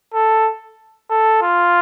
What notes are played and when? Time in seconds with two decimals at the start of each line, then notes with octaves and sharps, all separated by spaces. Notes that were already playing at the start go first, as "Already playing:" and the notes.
0.14 A4
1.10 A4
1.42 F4